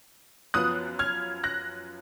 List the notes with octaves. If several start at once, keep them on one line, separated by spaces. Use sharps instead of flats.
F#2 F3 B3 D#6 F#6
F6 G#6
F#6 A#6